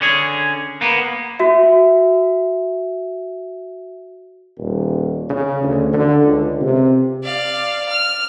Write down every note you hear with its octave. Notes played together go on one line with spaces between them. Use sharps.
D3 C#4 G#4
A#3 B3
F#4 E5
D#1
C#3
D2
D3
C#2
C3
D5 F5
F6